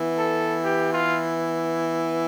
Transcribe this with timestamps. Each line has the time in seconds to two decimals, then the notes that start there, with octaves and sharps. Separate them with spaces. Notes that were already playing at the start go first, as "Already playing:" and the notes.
Already playing: E3 B3
0.17 A4
0.62 G4
0.91 F4